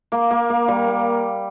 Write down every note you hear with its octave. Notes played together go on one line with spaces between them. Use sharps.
A#3
A#3
A#3
G3
A#3